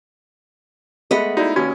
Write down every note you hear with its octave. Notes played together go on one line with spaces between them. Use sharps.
G#3 A3 B3 D#5 F#5 B5
D#4 E4 F#4 D5
F1 D#2 C#4 F#4 G#6